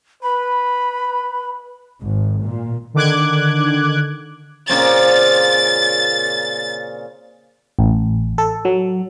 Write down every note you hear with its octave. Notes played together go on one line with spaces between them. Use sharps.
B4 B5
G#1
A#2
D3 D#3 D6 F#6 G#6
A#2 C#3 C4 A6
A1
A4
F#3